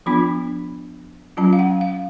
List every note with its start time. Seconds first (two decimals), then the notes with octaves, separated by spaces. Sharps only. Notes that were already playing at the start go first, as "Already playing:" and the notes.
0.06 F3 B3 D4 F4 B5
1.37 F#3 C#4 F4 A5
1.53 F5
1.59 F#5
1.81 F5